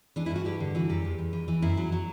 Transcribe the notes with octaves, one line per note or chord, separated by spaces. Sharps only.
E3 D4
E4
G2
F#4
G2 G4
D3
E3 F#4
F#2 G4
E2
E2
E3
E3
F#2 E4
F#3
F#3